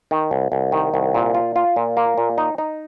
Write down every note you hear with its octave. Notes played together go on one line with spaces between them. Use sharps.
D#3
C2
C2
D#3
C2
A#2
F4
F4
A#2
A#3
A#2
D#4
D#4